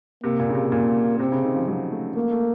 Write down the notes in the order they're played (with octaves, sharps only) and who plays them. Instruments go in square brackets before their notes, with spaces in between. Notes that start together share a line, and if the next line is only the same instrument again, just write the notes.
[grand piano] C3 [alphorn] A#3
[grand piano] A#2
C#3
C3
A#2
[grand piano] C3 [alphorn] C4
[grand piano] C#3
D#3
F3
F#3
A3
[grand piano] A3 [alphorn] A#3
[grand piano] A3